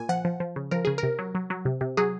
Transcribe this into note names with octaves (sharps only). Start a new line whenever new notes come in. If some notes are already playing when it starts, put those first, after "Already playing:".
Already playing: A#2 G#5
F3 F#5
F3
F3
C#3
F3 A#4
C#3 G#4
A#4
C3
F#3
F#3
F#3
C3
C3
F#3 G#4